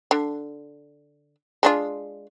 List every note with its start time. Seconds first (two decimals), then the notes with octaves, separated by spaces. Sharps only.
0.11 D3
1.63 G#3 D4 F4